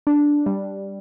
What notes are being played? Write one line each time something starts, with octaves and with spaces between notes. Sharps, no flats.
D4
G3